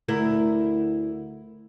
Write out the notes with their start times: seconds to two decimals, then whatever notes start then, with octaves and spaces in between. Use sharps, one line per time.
0.08 D2 E4 A#4